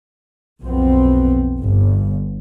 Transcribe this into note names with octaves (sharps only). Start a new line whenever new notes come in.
B1 F2 B3 C4
G1